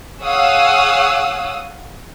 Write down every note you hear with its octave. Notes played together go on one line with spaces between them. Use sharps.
G#4 C#5 F5 F#5 D#6 E6